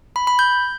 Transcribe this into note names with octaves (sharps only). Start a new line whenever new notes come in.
B5
B5
G6